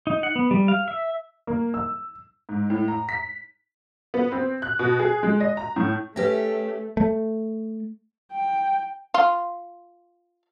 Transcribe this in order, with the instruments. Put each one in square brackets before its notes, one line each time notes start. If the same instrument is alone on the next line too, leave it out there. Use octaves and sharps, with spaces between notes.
[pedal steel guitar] D#4
F#5
B3
G3
F5
E5
[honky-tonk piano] A#3
E6
G#2
A2
A#5
B6
B3
C4
F#6
B2
G#4
G#3
D#5
A#5
A2
[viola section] A3 [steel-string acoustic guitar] C#4 G4 [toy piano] B4 E5
[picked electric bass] A3
[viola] G5
[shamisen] F4